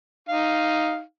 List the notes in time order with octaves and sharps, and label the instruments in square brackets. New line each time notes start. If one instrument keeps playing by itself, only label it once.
[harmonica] D#4 F5